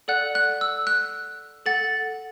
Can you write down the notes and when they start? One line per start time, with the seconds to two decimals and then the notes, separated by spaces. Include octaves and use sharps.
0.08 A4 D5 F#5 F#6
0.35 F#6
0.61 E6
0.87 F#6
1.66 A4 F#5 A6